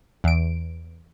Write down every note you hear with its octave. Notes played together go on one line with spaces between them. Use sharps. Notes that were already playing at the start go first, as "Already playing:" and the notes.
E2 D7